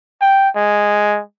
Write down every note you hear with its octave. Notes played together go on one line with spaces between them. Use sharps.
G5
G#3